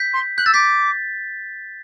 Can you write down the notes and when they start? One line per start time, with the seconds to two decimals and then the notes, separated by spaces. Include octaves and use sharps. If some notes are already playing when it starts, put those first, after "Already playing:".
Already playing: G6 B6
0.13 C6
0.38 F#6 G6
0.46 E6 A6
0.54 D6 G6 B6